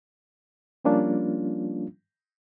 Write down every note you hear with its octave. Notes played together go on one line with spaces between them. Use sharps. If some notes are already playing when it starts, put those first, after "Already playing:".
F3 G3 A#3 C#4 D4 F4